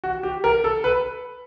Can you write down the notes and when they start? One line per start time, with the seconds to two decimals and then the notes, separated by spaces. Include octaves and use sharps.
0.04 F#4
0.23 G4
0.44 A#4
0.64 A4
0.84 B4